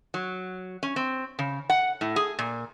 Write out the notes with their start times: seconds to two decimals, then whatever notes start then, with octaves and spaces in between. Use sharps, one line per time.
0.14 F#3
0.83 C#4
0.96 C4
1.39 C#3
1.70 F#5
2.01 A2
2.16 G#4
2.39 A#2